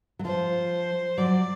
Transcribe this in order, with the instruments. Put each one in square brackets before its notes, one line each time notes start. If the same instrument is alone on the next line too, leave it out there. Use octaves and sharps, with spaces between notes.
[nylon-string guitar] F#3
[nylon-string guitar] F3 [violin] C5
[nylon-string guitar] F#3 [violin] D5